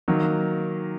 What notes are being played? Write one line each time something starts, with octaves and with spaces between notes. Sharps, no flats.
D#3 F#3 A#3